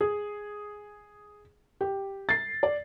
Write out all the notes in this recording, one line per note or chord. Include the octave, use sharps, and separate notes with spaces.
G#4
G4
A6 C7
D5